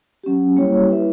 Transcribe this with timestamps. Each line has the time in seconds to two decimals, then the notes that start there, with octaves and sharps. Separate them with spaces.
0.24 F#3 C#4 G4
0.56 G3 A#3 E4 G4 C#5
0.89 E4 B4 E5